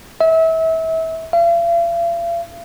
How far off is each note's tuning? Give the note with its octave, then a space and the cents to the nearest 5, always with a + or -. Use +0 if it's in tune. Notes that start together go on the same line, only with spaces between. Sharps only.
E5 -30
F5 -45